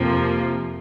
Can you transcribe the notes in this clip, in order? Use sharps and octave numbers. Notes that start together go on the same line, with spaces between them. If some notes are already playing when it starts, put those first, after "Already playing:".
Already playing: F2 C3 F3 A#3